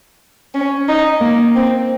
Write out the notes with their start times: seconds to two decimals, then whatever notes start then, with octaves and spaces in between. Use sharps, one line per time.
0.54 C#4
0.88 D#4
1.20 A#3
1.55 C4